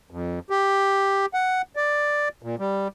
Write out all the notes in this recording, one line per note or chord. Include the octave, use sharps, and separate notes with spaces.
F2
G4
F#5
D5
A#2
G3